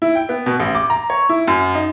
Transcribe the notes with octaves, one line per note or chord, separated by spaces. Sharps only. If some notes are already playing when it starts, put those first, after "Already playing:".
E4
G5
B3
B2
A1
D6
A#5
C#5
E4
F#2
D#4